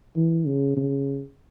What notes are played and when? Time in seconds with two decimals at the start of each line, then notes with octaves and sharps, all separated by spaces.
0.16 E3
0.47 C#3
0.77 C#3